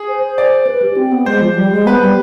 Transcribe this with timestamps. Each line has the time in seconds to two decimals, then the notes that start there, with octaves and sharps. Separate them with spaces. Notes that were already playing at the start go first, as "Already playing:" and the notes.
Already playing: G#4
0.08 C5
0.23 C5
0.38 D5
0.67 B4
0.82 G4
0.97 C4
1.12 B3
1.26 G#3 C5
1.42 F3
1.57 G3
1.72 G#3
1.86 B3 B4
2.01 G3